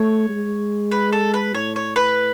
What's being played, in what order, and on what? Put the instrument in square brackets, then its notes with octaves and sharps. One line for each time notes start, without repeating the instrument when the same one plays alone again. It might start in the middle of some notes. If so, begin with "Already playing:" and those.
Already playing: [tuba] A3 [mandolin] C#5
[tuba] G#3
[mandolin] B4
A4
B4
[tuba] A2 [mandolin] C#5
[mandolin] C#5
B4